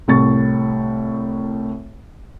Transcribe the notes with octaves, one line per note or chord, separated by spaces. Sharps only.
C2 A2 C#6 A6